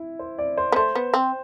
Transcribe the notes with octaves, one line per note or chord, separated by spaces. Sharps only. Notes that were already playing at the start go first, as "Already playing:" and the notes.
Already playing: E4
C5
D5
C5
B3
A3 C5
B3
C4